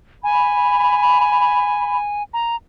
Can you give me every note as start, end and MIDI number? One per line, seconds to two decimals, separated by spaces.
0.24 2.23 80
0.24 1.96 83
2.34 2.56 82